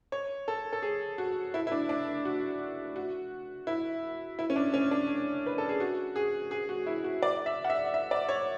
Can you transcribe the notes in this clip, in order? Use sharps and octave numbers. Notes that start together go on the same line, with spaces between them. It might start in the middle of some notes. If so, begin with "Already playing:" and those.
C#5
A4
A4
G#4
F#4
E4
E4
D4
D4
F#4
F#4
E4
E4
C#4
D4
C#4
D4
B4
A4
G#4
F#4
G#4
G#4
F#4
E4
F#4
D5
E5
F#5
E5
E5
D5
C#5